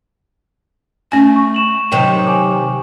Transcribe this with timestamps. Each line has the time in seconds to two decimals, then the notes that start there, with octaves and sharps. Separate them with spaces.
1.12 A3 C#4 G#5
1.36 C#6
1.54 C#6 E7 F#7
1.92 C3 D#3 F#3 B4 G5
2.27 G#5 D6